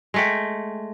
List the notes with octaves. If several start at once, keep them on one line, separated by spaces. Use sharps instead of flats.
G#3 A3 G5